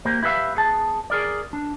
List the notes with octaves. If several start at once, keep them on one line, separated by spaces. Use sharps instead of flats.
A#3 G4 A#4 C5
E4 G4 B4 E5 F5
B3 G#4 A5
G#4 A#4 D5
D4